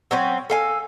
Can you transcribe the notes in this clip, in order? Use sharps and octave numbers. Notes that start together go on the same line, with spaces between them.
F#3 C4 C#4
A4 F5 G#5